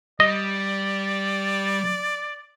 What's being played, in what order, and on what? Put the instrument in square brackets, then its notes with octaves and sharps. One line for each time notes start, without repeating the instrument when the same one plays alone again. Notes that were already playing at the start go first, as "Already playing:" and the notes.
[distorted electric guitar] G3 [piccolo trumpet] D5 [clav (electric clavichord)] D#5